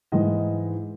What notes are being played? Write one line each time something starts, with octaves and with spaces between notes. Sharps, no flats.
G#2 E3 D#5